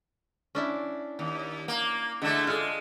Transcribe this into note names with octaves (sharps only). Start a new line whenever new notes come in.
C#4 D4 E4
D#2
A#3
D3 G#3 A3 E4 E5
G#3 F4 A4